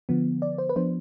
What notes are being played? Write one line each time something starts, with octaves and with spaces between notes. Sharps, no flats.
D3 F3 B3
D5
C5
B4
F3 B3 D4 C5